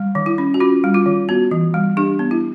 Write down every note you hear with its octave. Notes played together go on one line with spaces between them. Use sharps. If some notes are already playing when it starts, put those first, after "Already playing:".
Already playing: G3
D#3
E4
C#4
F#4
C#4 F4
G3
F4
D#3
B3 F#4
E3
G3
D4 G4
B3
E4